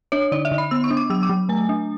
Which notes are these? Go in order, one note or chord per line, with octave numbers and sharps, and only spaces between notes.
D4 C#5
D3 D5
E5
D3
B5
B3 E6
C#6
D4
D6
F#3 E6
D6
F#3
A3 G#5
D4